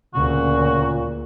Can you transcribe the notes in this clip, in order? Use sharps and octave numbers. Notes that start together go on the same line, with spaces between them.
D2 A#2 C#3 F#4